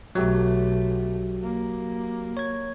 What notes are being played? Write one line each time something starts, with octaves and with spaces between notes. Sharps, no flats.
B1 F#3 A3 F#4 G4
A#3
C#5 G#6